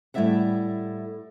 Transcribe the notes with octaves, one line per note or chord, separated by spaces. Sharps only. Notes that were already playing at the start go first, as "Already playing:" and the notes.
A2 G3 E4 D5 E5 F#5